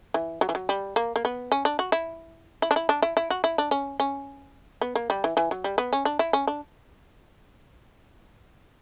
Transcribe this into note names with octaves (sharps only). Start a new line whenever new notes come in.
E3
F#3
E3
F#3
G3
A#3
A#3
B3
C#4
D4
F#4
E4
E4
D4
E4
D4
E4
E4
F#4
E4
D4
C#4
C#4
B3
A#3
G3
E3
E3
F#3
G3
B3
C#4
D4
E4
C#4
D4